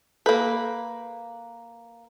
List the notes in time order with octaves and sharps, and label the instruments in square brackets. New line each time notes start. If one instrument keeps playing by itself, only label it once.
[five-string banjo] A#3 B4 [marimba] A4